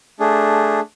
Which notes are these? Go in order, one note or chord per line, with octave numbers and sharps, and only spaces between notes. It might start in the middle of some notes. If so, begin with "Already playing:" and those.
A3 D4 G#4